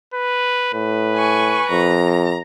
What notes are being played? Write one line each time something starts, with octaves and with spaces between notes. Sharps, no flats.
B4
A2 B4
G#5 C#6
F2 A#5